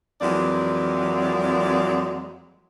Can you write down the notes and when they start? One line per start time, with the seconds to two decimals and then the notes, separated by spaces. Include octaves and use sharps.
0.21 F2 E3 F#3 G#3 A#3 D5